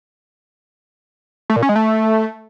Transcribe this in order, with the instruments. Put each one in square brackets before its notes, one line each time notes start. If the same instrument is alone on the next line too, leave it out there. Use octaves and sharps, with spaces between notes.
[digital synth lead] A3
A#2
C#4
G#3
A3